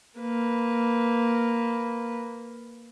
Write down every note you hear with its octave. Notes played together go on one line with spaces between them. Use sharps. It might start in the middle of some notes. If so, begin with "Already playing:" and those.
A#3 B4